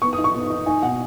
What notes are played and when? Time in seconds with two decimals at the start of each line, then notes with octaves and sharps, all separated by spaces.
0.02 B3 C#6
0.13 D#6
0.18 D#4
0.24 C#6
0.35 B3
0.50 D#4
0.66 D#4 G#5
0.82 B2 F#5